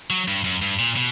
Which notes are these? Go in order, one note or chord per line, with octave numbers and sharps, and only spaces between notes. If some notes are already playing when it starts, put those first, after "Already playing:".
F#3
G2
F#2
G2
A#2
B2